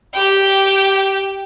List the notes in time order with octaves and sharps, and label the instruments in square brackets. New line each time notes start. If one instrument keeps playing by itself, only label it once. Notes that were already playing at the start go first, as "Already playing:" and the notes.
[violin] G4 G5